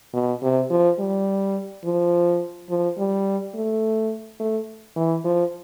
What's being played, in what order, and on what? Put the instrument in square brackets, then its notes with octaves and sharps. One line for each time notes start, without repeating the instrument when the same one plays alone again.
[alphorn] B2
C3
F3
G3
F3
F3
G3
A3
A3
E3
F3